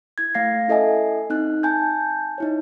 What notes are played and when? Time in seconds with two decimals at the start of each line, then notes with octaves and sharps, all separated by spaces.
0.18 E4 G#6
0.34 A3 F5 A#6 C7
0.68 C#4 E4 A4 D#5 E5 G#5
1.30 C4 D#4 F#6
1.63 G#5 A5 G6
2.38 D#4 E4 C#5